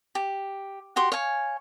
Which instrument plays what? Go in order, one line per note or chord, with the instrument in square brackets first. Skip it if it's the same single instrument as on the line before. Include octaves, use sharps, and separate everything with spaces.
[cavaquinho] G4
F#4 G4 C6 C#6
C#5 F5 G#5